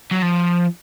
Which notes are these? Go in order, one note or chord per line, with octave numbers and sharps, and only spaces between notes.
F#3
F3